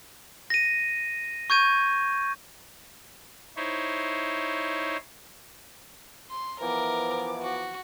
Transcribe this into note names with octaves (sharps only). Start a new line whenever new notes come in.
A#6 D#7
C#6 G6 G#6 D#7
D#4 E4 C5 C#5
C6
E3 F3 B3 A#4 D6
F#4